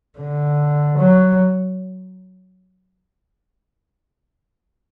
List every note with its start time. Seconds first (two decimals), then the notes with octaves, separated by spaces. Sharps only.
0.18 D3
0.98 F#3